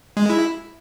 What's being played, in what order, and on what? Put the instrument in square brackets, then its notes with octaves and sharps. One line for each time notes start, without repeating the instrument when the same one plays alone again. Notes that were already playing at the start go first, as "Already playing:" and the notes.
[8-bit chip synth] G#3
E4